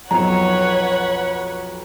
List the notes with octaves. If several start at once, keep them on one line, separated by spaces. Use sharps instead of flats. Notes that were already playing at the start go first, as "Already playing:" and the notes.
B1 F2 B4 C#5 F#5 A#5